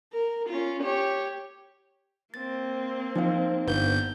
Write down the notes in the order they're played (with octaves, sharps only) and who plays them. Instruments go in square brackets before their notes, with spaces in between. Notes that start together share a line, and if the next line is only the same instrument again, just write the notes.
[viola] A#4
C#4 F4
G4 C#5
[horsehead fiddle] A#3 C4 [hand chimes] A6
[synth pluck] F3 [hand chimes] D#4 C5 F5
[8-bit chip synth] G1 G6 [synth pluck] B3